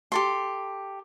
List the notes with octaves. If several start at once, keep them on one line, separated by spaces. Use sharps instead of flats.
G4 A4 C6